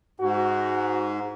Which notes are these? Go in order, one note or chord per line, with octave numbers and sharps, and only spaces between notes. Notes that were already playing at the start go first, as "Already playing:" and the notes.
G#2 F#4